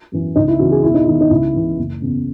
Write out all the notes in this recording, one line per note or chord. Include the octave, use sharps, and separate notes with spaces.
F#2 E3
C#2 D#4
E4
C#3 E3 F#4
G#4
E1 E4
D#4
E2 D#3 E4
D#4
C#2 E4
C#3 E3
F#1
E2 C#3